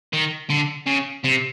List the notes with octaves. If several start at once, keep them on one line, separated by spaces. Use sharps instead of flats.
D#3
D3
C#3
C3